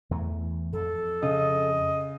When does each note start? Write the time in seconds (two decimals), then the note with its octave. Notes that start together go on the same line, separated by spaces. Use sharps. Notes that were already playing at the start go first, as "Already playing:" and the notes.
0.11 E2 E3 A3
0.73 F2 A4
1.23 C#3 D#5